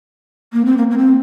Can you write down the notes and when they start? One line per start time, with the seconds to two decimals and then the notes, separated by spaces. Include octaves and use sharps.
0.53 A#3
0.65 C4
0.77 A#3
0.91 A#3
0.97 C4